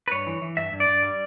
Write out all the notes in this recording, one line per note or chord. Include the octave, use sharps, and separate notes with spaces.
B4
G2 C#5
E3
E3
G2 E5
G2
D5
G2
G3